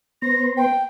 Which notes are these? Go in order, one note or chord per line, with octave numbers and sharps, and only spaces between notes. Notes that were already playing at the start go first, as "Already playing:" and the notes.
B3 C5 A#6
G5